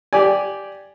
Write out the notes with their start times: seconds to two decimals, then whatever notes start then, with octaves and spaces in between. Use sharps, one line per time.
0.13 G4 D5 G#5